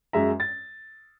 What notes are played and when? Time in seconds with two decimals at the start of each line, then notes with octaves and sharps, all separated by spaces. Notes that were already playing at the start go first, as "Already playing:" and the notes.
0.13 F#2 G#3 E5 A#5
0.40 A6